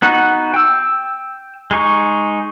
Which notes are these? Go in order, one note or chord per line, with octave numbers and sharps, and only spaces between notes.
B3 D#4 F#4
G5 E6
G#3 D#4 C#6